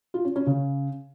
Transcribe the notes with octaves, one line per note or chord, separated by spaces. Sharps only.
F4
C#4
C#4
C#3